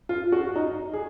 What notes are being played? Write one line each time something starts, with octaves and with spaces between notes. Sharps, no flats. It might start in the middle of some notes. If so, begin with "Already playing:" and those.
F4
F#4
D#4
G#4